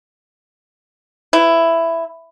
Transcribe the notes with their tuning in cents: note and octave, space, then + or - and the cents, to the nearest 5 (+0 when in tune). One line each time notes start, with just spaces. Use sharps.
E4 +10 B4 +30